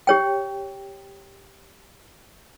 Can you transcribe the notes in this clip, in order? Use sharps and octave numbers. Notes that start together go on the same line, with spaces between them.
G4 C#5 G5